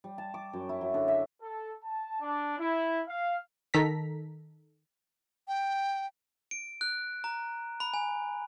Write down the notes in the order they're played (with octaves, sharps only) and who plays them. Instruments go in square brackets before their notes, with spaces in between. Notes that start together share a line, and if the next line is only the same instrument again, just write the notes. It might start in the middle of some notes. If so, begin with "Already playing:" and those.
[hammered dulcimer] G3
A5
D6
F#2
E4
F#3
D3
E5
[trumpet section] A4
A5
D4
E4
F5
[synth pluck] D#3 A4 A#5 B6
[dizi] G5
[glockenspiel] D7
F#6
A#5
B5
G#5